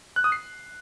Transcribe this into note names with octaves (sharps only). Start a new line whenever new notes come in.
F#6
D#6
C7